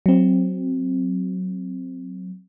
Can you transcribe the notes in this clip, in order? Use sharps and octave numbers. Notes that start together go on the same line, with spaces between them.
F#3 C4